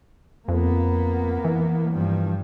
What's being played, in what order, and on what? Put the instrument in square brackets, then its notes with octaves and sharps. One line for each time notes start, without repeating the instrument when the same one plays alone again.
[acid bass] F2 [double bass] A#3 B3
[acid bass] E3
[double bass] G2 F3